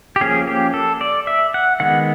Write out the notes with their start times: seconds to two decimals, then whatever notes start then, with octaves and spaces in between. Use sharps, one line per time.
0.16 G4
0.21 F3 A#3 C#4 G#4
0.47 G4
0.74 A4
1.01 D5
1.27 E5
1.54 F#5
1.80 D#3 G#3 B3 F#5